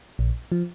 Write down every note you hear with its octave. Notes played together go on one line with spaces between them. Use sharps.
A#1
F3